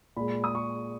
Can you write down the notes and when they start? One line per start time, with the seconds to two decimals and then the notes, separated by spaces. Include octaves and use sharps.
0.17 A#2 G#3 B5
0.44 D#6
0.55 C#6